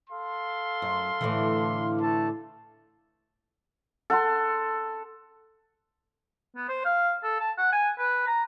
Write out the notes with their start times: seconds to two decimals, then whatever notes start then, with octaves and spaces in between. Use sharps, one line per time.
0.10 A4 F5 C6
0.82 F#2
1.21 A2 D3 E3
2.01 A3 A4 A5
4.10 A4 F#5 A5 C6
6.56 B3
6.69 C5
6.85 F5
7.23 A4
7.40 A5
7.58 F#5
7.72 G#5
7.99 B4
8.27 A#5